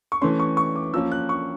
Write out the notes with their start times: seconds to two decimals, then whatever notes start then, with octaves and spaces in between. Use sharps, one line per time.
0.12 C#6
0.22 E3 A3 C#4 C6
0.39 C#6
0.57 C#6
0.76 D6
0.94 F3 A#3 C#4 E6
1.11 F#6
1.29 C#6